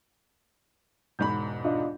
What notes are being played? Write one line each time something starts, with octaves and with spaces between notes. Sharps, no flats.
E1 G#2 B5 G6
D4 F4 D#5